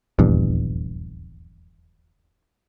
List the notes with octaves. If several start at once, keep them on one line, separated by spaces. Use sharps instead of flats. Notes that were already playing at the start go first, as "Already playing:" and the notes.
D#1 A#1 E2 G2